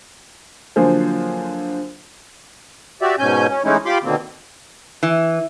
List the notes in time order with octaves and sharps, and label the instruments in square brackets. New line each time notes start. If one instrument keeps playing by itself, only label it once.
[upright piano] D3 F3 F#3 A#3 G#4 C5
[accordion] F#4 G4 D5 E5
G#2 B2 C#4 G#5 G6
C#4
E3 G#3 A3 C#4 D#4 E4
F4 G4 B5 C6 D6
B2 D3 D#3 A#3 C4
[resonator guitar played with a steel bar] E3